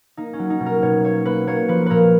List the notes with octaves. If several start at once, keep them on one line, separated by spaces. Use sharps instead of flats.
A#3 D#4
C#4
F#3
D#4
B2
A#4
B2 C#5
A#3 C#5
A#3 B4
A#3 C#5
F3 B4
A#2 A#4 B4